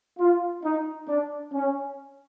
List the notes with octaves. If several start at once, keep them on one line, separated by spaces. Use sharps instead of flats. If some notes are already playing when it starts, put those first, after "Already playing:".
F4
D#4
D4
C#4